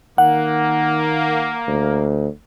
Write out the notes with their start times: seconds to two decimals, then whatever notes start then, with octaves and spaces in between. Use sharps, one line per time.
0.18 D#3 A#3 F#5
1.67 D2